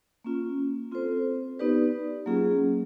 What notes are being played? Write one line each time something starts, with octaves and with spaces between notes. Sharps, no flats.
A#3 C#4 F4
C4 F4 A4 C5
B3 D#4 G4 B4 D5
F#3 A#3 C#4 F4 G#4